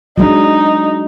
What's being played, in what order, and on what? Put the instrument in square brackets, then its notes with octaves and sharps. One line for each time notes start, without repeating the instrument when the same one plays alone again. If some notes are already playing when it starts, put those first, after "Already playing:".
[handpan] F#3 G#3 D4 [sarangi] D#4